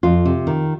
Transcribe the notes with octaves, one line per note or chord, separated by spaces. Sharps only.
F2 F4
C3
D#3